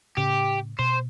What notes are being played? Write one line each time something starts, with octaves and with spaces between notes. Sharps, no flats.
A2 C#3 C#4 G4
B2 C5